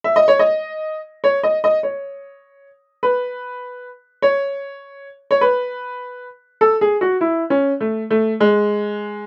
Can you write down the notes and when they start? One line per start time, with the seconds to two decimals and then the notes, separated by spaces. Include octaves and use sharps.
0.04 E5
0.16 D#5
0.28 C#5
0.39 D#5
1.24 C#5
1.43 D#5
1.64 D#5
1.83 C#5
3.03 B4
4.22 C#5
5.31 C#5
5.41 B4
6.61 A4
6.81 G#4
7.01 F#4
7.21 E4
7.50 C#4
7.80 A3
8.10 A3
8.40 G#3